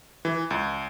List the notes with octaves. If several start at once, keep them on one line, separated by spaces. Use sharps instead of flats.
E3
C#2